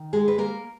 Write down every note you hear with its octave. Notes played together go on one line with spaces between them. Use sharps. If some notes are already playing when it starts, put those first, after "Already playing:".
Already playing: D#3
G#3 G#4
B4
A#3 A#4